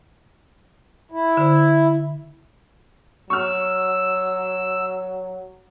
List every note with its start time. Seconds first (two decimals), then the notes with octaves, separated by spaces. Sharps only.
1.12 E4
1.37 D3 C5
3.30 F#3 C#6 E6 F6